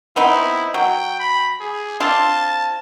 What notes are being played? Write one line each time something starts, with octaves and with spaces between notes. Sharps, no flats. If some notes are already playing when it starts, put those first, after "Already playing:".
B3 C4 D#4 E4
F#3 G5
B5
G#4
C4 D4 F4 A5